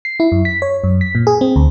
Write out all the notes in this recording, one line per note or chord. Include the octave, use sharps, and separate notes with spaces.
C7
E4
F#2
B6
C#5
F#2
B6
A#2
G#4
C4
D2